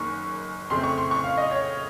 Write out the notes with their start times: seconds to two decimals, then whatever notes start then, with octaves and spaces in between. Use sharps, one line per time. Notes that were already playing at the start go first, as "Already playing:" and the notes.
Already playing: F#1 F#2 D#3 A#3 C#6
0.70 F2 C#3 A3 C4 C6
0.84 C#6
0.98 C6
1.11 C#6
1.24 F5
1.37 D#5
1.51 C#5